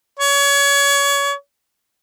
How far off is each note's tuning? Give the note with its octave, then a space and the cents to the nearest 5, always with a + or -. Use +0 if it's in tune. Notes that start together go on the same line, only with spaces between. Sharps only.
C#5 +30